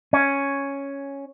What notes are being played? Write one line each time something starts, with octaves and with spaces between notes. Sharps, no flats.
C#4